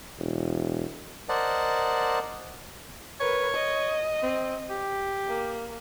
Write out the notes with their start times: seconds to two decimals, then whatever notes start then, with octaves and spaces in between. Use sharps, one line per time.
0.19 E1
1.29 A#4 C5 D5 D#5 F#5 A5
3.20 A#4 B4 C#5
3.54 D#5
4.22 C4
4.70 G4
5.27 A#3